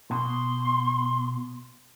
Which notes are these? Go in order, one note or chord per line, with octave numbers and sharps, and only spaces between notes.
B2 C6